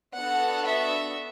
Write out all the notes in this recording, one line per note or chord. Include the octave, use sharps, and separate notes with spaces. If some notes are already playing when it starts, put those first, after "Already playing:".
B3 D4 F#4 A4 F#5
E5